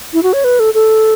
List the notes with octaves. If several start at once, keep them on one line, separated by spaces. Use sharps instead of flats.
E4
F#4
C#5
B4
A4
A4